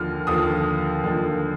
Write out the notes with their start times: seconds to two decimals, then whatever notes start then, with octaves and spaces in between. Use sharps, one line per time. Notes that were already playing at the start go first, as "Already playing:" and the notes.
Already playing: D#2 D3 F3 F6
0.27 D#2 D3 F3 D#6
1.03 D#2 D3 F3